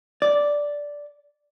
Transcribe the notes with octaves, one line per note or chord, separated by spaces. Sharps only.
D5